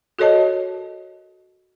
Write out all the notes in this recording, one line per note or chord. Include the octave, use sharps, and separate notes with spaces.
F#4 A4 A#4 C#5 D#5 A5